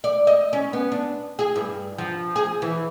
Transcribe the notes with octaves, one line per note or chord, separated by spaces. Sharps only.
D5
D#5
C#4
B3
D4
G#4
G2
F3
G#4
E3